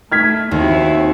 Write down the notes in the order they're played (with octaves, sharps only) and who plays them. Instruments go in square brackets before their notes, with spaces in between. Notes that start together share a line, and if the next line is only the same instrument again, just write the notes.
[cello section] A3 [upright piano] F6 G#6 B6
[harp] D#2 [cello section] C4 E4 F#4